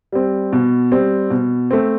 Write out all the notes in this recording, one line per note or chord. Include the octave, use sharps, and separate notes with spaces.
G3 C4
B2
G3 C4
B2
A3 C4